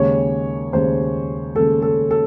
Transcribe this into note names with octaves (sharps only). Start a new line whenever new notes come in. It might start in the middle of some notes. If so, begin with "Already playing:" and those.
Already playing: D#2 C#3 G#3 C#5
D#2 C#3 G#3 C5
D#2 C#3 G#3 A4
A4
A4